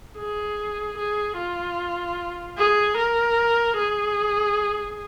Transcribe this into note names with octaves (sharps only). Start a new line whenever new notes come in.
G#4
G#4
F4
G#4
A#4
G#4